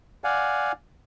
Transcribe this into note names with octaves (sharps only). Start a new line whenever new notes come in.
D5 F5 F#5 G#5